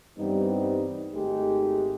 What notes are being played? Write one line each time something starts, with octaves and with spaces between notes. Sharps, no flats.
G2 E3 G3 B3 C4 D#4
G#1 G#3 A3 D#4 G4